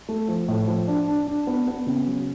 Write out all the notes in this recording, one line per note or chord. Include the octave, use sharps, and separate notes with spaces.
A3
F3
A2
F3
D4
D4
D4
B3
B3
C#3
F#3